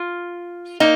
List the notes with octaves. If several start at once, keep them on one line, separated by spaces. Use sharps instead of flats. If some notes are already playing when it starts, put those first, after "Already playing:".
Already playing: F4
A#3 D#4